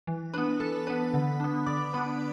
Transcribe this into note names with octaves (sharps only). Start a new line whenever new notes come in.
E3
B3 D4 B4 B5
E3 A4 A5
B3 D4 B4 B5
D3
B3 D4
D3 D5 D6
B3 D4 B4 B5